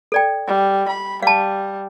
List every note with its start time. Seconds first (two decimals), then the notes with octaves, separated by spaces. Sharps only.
0.12 A4 D5 G5
0.47 G3
0.88 B5
1.23 G3 F5 A5